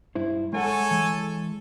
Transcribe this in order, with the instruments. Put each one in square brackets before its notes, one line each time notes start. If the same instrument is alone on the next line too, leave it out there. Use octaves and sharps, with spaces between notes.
[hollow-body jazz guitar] G2 E4 C5
[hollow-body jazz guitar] G#3 F5 F#5 [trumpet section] A4 C#5 G#5
[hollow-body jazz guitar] E3 G#3